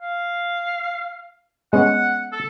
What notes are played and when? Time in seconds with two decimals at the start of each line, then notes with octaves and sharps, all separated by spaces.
0.01 F5
1.73 G#3 B3 C#4 F#5
2.32 A4